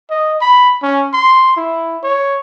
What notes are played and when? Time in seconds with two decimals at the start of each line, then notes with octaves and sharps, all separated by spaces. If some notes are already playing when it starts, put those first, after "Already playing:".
0.10 D#5
0.41 B5
0.83 C#4
1.13 C6
1.57 E4
2.03 C#5